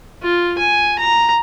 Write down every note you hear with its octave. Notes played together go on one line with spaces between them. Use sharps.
F4
G#5
A#5